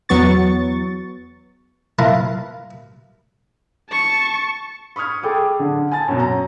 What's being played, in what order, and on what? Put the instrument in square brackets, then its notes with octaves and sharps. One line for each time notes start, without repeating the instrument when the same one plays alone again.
[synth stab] E2 F#3 B3 C#6 A6
[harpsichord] E4 A#4 B4 F5 A5 B5
[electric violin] A5 C#6
[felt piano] B5 C#6 D#6 F6 G#6
G#4 A4 G5 D6
D3
G#5 A5 A6
F#2 B2
A#5